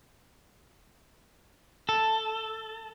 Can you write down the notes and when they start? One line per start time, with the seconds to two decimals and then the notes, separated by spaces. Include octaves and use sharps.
1.89 A4